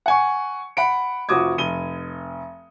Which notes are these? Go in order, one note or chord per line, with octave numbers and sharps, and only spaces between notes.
F#5 G#5 C#6
F#5 B5 D7
F1 F3 F#4 D6 D#6 G#6
F1 D#7 G7